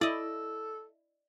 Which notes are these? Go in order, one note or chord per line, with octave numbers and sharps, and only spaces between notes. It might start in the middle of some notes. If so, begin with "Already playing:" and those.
E4 A4 D5 D#5